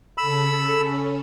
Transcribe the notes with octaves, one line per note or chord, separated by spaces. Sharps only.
C#3 A4 B5 E6
C#4